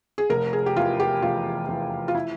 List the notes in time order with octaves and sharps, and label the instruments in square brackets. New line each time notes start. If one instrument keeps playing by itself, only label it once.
[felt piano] G#4
F1 A#4
G#4
G4
E2 E3 F4
G4
F1 F4
E2 E3
F4
E4